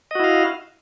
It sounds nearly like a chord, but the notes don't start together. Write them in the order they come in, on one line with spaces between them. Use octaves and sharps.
D#5 F#4 E4 F5